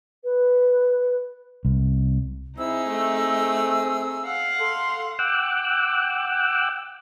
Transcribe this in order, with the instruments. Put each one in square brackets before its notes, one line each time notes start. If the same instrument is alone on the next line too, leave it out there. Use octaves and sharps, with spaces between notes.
[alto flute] B4
[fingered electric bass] C2
[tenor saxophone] C4 [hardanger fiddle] D#4 G#4 [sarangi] E4 [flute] E6
[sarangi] A3
[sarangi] F5 [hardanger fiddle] F#5
[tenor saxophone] A4 [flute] C6
[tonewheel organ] F#5 G5 D6 E6 F#6